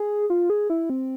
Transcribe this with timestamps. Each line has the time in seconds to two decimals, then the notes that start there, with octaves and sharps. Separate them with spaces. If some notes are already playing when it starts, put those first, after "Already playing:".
Already playing: G#4
0.30 F4
0.50 G#4
0.70 E4
0.90 C4